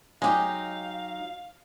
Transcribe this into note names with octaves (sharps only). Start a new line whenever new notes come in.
F#3 G#3 D#4 G4 F5